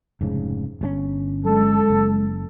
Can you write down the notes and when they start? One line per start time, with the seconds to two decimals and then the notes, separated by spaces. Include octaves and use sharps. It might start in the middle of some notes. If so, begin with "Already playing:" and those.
0.21 F1 G#2 C#3
0.81 G1 C3 C#4
1.45 F#3 G#3 A4
1.90 F#1